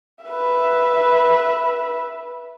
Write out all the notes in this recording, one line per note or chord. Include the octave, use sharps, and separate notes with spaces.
B4 E5